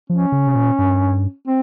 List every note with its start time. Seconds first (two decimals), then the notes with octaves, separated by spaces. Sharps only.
0.10 F3 C#4
0.32 C#3
0.46 C3
0.55 A#2
0.79 G2
1.47 C4